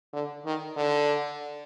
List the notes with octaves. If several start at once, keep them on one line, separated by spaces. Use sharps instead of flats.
D3
D#3
D3